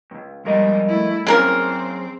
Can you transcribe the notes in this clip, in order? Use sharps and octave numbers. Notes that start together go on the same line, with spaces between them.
C#2 G2
F2 G3 G#3 A#4 D#5
A3 E4
C#3 F#3 A#3 C4 G#4 A#4 C#5